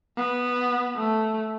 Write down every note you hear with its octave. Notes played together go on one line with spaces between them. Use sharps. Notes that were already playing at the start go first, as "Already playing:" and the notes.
B3
A3